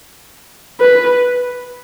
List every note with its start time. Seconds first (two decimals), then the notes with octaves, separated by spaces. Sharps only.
0.80 B4